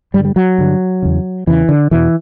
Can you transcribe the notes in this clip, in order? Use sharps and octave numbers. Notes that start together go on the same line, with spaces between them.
G2 D3 G3
G3
F#3
G2 D3
E2 C#3
E2 C#3 E3
D3
E2 B2 E3